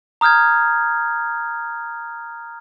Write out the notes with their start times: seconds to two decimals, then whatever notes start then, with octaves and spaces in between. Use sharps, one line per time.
0.21 A#5 D#6 F6 G6 G#6